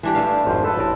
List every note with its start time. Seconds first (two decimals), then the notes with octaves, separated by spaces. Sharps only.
0.03 E3 D4 G4
0.15 G2 A3 F5
0.45 G#1 F2 G#2 F4 C5
0.64 A4 B4
0.77 A1 A#4